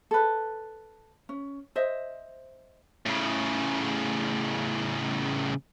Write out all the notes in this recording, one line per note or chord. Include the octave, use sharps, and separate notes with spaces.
A4 B4
C#4
C5 D#5 E5
A2 C#3